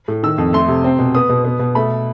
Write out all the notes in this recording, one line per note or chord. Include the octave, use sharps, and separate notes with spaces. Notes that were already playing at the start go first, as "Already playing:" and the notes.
A2
D#3 E6
F2
A3 C6
C3
C4
B2
B3 D#6
B2
B3
B2
A3 B5